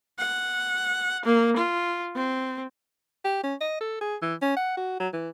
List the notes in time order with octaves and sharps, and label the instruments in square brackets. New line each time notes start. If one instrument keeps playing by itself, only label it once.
[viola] F#5
A#3
F4
C4
[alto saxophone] G4
C#4
D#5
A4
G#4
E3
C#4
F#5
F#4
F#3
E3